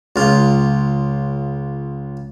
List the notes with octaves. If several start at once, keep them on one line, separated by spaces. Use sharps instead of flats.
C#2 F4